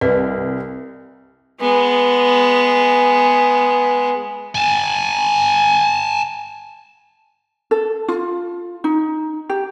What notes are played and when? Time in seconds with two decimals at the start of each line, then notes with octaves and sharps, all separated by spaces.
0.01 C2 B4 D#5
1.61 G#3 B3
4.55 G#5 A5
7.71 A4
8.08 F4
8.84 D#4
9.50 G4